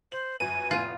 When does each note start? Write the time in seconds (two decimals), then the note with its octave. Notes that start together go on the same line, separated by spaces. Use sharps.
0.12 C5 F#7
0.40 G1 F#2 B4 G#5 D#7
0.71 F1 A2 B3 F4